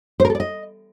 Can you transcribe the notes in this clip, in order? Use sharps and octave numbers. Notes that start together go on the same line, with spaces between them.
C5
A#4
A4
D5
D#5